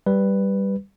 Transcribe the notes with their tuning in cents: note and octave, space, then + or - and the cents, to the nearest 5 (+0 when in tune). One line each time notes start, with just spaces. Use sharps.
G3 +0 B4 +0